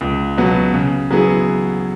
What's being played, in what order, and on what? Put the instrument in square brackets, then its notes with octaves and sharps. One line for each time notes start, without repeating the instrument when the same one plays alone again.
[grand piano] C#2
B2 F#3 B3
C#3
F#3 B3 E4 G#4